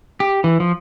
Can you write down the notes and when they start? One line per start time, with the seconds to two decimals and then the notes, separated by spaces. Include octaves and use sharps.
0.20 G4
0.44 E3
0.60 F3